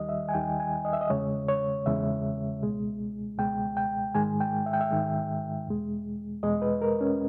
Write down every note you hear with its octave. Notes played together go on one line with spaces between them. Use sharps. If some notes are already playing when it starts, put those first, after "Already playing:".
Already playing: D#2 D#3 G3 D#5
E5
G#5
D#2 D#3 G3 G5
G#5
D#5
E5
D#5
E2 C#3 G#3 C#5
C#5
E2 C#3 G#3 E5
C#2 B2 G#3
C#2 B2 G#3 G5
G5
G#2 D#3 G#3 G#5
G5
E5
G5
E5
G#2 D#3 G#3
E2 B2 G#3
E2 B2 G#3 D#5
B4
A#4
C#4